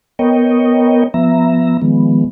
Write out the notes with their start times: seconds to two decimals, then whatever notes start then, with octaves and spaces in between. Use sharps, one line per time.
0.19 B3 A#4 C#5 D#5 G5
1.14 F3 B3 E5 A#5
1.82 D#3 F3 G#3 B3